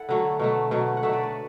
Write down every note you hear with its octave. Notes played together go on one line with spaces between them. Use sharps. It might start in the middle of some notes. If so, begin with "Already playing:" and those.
Already playing: E4 A4 F#5
D3 F#3 A3
B2 F#3 A3
B2 F#3 A3
F#5
B2 F#3 A3 E5
D5
B4